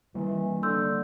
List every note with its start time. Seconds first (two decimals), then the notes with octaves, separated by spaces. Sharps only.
0.15 E3 G3 A#3
0.63 D3 C6 E6 G6